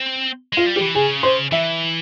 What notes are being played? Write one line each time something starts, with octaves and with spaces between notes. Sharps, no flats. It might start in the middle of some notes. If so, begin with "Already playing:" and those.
Already playing: C4
G#3 F4
G3
G4
E3
C#3 G#4
C5
E3 E5